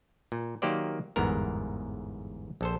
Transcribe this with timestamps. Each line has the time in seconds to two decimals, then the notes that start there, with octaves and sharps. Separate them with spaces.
0.32 A#2
0.62 D#3 F#3 A#3 G4 C5 D5
1.16 G1 E2 G#2 B3 A#4
2.61 A#1 A4 C5